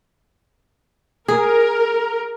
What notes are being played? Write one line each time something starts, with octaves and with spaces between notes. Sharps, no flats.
G#4 A#4